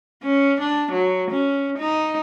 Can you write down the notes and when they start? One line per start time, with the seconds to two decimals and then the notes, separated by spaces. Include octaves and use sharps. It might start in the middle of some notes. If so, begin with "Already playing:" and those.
0.23 C#4
0.60 D4
0.92 F#3
1.31 C#4
1.78 D#4